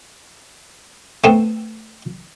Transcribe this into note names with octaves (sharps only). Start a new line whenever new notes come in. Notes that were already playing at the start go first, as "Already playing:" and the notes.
A3 B3 C4